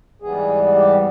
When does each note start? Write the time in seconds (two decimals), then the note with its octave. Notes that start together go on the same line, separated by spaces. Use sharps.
0.22 G#2 E3 G3 B3 G#4
0.75 G4